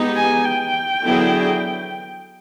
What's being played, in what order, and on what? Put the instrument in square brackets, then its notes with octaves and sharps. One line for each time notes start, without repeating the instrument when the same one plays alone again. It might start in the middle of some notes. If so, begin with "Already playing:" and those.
Already playing: [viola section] G#3 B3 D#4 G4
[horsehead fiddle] G#5
G5
[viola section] D3 F#3 B3 E4 G#4